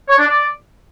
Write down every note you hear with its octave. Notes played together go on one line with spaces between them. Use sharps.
C#5
D4
D5